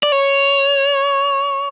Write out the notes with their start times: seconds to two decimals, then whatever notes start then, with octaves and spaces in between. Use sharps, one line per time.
0.03 D5
0.12 C#5